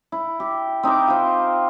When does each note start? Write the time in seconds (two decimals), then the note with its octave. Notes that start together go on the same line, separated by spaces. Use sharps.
0.12 E4
0.40 G4
0.83 C4 D#4 A#4 D6
1.08 F4 C5